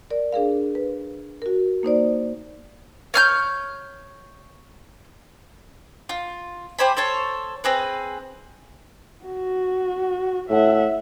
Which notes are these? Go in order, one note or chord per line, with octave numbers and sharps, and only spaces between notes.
A#4 D5
D4 G#4 A#4 F5
B4
F#4 A#4
A#3 D#4 C5 D5
C#5 F6 G6
F4
G4 C5 G#5 B5
A4 C5 C#5 A5
C4 G#4 B4
F#4
A2 E5 F#5